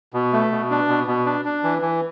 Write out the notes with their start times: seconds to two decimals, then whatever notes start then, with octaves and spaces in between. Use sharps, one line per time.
0.13 B2
0.33 A3
0.51 B2
0.70 D4
0.89 B2
1.07 B2
1.26 D4
1.45 D4
1.63 E3
1.82 E3